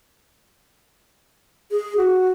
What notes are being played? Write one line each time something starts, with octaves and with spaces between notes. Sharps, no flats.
G#4
F#4